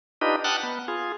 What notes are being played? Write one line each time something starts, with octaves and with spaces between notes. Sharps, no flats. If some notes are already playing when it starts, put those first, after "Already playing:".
D4 D#4 F4 G4 B4 D#5
F#5 G5 A5 D#6 F6 F#6
B3
F4 G#4